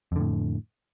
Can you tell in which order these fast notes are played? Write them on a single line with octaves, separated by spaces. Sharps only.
F2 D3 A2